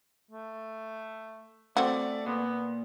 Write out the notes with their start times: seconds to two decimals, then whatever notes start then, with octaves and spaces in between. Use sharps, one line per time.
0.31 A3
1.77 A3 C4 F#4 D5
2.26 A#2 B3